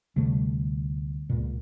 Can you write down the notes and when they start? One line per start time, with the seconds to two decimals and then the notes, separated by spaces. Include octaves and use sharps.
0.16 D2 C3 G3 A3
1.30 C#2 A#2